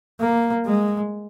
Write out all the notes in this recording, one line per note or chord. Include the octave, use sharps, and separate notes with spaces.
A#3
G#3